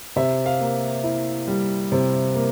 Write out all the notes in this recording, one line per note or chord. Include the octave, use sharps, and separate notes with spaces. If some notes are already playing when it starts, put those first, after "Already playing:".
C3 E5
F5
A#3
E4
G3
C3
A#3